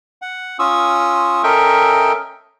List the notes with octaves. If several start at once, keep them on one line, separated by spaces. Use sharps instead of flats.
F#5
C#4 F4 C#6 D#6 E6
C#4 A4 A#4 D#5 E5 G5